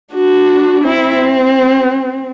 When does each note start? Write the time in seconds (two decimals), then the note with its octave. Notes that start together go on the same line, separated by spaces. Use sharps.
0.14 D4 F#4
0.84 C4 E4